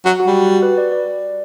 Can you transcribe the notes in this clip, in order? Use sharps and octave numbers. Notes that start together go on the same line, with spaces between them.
F#3 F#4
F#4
G3
F#4
B4
D5
D5